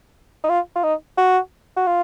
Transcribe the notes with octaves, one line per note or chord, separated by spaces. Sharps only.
D#4
F4
F4
D#4
F#4
F#4
F4